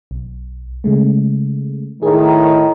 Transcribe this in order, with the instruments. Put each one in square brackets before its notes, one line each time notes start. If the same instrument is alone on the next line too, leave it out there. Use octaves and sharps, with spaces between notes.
[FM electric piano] B1
C#3 G#3 A3
[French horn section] A2 D#3 [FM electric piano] G#4